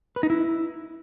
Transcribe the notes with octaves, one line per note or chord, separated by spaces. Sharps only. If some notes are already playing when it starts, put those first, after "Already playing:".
B4
D#4
E4